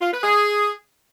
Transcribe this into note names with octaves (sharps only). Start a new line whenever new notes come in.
F4
B4
G#4